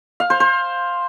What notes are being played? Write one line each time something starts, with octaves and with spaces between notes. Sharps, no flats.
F5
C5
C5